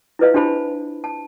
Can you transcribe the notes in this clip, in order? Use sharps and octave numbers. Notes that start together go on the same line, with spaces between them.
E4 F4 B4 D#5 F5
D4 E4 G4 C5 A5 B5
A5